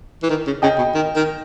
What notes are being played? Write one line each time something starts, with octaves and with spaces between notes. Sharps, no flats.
E3
D#3
C#3
C#3 D#5 G5
B2
D#3
D#3